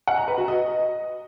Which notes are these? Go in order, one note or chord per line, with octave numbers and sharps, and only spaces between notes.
F#5
A#5
B4
F#4
D#5